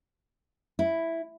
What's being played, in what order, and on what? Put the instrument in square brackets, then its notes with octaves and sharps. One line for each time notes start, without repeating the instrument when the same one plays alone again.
[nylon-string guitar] E4